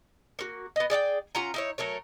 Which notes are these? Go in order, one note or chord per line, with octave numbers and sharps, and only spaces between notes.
A#3 F#4
B3 D#5
G#4 D5 F#5 G5
C#4 F4 F#5 A#5
D#4 E4 C#5
F#3 A3 A#4 C#5